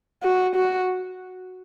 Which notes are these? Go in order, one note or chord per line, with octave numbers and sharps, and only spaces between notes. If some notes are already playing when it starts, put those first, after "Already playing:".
F#4
F#4